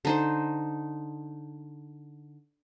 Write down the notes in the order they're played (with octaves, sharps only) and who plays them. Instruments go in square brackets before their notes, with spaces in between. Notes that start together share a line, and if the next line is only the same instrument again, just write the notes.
[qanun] D3 D#4 C5